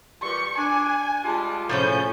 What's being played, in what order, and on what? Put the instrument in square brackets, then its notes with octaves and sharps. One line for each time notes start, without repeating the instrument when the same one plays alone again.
[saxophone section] A#2 E3 G3 [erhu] C#6
[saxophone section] D4 [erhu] G#5
[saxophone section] G3 G#3 F4 [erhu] A5
[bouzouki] A2 F3 C#4 [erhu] G6